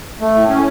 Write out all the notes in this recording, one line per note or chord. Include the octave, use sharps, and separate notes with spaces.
A3
A2
C#4